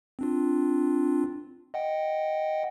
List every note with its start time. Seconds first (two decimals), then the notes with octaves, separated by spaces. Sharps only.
0.19 C4 D4 F4
1.74 D#5 F#5 G5